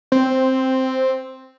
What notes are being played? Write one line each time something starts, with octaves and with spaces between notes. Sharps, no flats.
C4